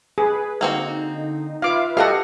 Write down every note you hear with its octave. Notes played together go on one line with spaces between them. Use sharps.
G#4 B4
D3 A#3 C4 D#4 F#4
F4 B4 E5 F5 D6
F#4 G4 A4 D#5 F5 F#5